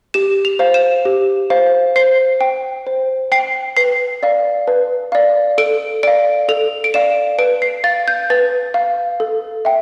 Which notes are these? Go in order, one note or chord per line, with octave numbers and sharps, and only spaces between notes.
G4 E7
F7
C5 F5
E7
G4
C5 F5
C5 C7
G5
C5
G5 C7
B4 C7
D5 F5
B4
D5 F5
A4 D7
D5 F5 D7
A4 F7
D7
D5 F5 E7
B4 D7
C7
F5 A6
G6
B4 A6
F5
A4
E5 G5